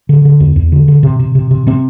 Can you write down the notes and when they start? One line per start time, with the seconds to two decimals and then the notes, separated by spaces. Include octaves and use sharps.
0.09 D3
0.25 D3
0.40 E2
0.56 E2
0.72 D3
0.88 D3
1.03 C3
1.19 C3
1.35 C3
1.51 C3
1.67 C3 C4